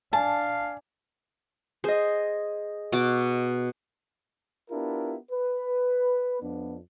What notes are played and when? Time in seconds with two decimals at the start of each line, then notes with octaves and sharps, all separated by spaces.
0.13 D4 F5 G#5 A5
1.84 G#4 C5 D#5
2.92 B2 F#4 D6
4.70 B3 D4 E4 F4 G4 A#4
5.32 B4
6.42 F2 B3 D4